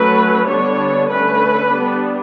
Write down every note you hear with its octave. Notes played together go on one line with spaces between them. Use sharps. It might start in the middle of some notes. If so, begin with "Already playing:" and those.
Already playing: F#3 A3 C#4 B4
D3 G3 B3 D4 C#5
D3 A3 C#4 B4
G3 B3 D4